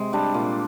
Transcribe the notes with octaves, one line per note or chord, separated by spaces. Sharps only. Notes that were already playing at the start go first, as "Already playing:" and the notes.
Already playing: C3 G#3
G3 D4
A#2